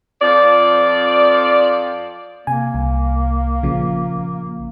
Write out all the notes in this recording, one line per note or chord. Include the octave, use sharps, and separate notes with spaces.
F2 F3 D5
C3 A#3 G#5
C2
A#1 C#3 F3